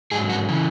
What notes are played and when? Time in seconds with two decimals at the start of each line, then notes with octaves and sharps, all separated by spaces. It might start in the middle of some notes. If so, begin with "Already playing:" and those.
0.12 G#2 F#3 G#4
0.29 F#4
0.48 C#3 E3